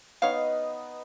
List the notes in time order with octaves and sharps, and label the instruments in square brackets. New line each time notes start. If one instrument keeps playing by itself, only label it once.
[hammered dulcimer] B3 D#4 [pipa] C#5 F5